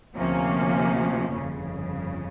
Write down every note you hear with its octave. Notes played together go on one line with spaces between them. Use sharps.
D2 C3 F3 A#3 C#4
G1 F2 C#3